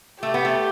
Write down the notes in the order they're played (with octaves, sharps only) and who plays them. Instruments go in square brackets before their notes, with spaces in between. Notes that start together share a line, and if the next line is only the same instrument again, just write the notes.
[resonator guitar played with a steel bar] A3 [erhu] G4
[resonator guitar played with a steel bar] B3
A3